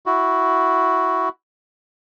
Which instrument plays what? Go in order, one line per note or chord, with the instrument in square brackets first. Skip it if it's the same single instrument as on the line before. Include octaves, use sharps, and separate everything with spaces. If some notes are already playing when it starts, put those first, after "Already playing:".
[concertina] E4 F#4